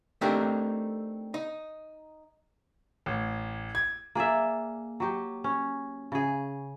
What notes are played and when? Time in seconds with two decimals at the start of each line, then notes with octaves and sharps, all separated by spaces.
0.21 A3 C4 D4 D#4 G4 A#4
1.34 D#4
3.06 A1
3.75 G#6
4.15 A#3 G#4 D5 E5
5.00 F#3 G4
5.44 C#4
6.12 C#3 G#4